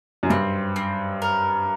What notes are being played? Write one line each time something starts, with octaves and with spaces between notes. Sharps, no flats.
F#2
G2 C4
C4
A#4